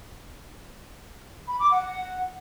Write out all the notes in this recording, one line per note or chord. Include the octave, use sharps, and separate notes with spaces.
B5
D6
F#5